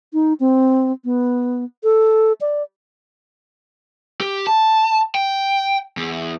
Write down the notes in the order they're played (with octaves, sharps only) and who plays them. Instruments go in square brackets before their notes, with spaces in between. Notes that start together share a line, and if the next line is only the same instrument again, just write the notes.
[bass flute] D#4
C4
B3
A4
D5
[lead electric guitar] G4
A5
G5
E2